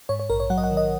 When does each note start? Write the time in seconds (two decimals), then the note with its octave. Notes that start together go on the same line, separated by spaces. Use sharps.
0.09 G#2 C#5
0.19 C#5
0.30 A#1 A#4
0.40 C#5
0.50 F#3 F#5
0.58 D#5
0.64 F#5
0.71 D#3
0.77 D#5